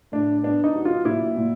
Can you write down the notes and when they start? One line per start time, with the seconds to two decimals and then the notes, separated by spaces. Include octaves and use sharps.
0.12 A2 D4
0.43 B3 D4
0.64 D#4
0.75 F#3
0.85 F4
1.05 A#2 E4
1.37 A#2